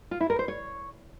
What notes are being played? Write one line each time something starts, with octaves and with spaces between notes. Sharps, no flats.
F4
E4
A#4
C5
C#5